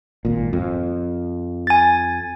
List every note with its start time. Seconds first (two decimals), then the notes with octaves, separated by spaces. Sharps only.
0.25 G#1 A#2
0.53 F2
1.67 G#5 A6